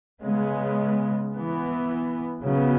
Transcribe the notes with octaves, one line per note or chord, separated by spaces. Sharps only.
C#3 G#3 B3
E3 B3
C#3 F#3 B3